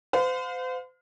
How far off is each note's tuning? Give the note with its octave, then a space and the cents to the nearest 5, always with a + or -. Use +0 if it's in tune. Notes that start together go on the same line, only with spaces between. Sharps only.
C5 -40 F5 +35